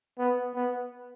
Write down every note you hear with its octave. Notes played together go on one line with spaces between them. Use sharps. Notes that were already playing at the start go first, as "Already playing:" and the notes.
B3
B3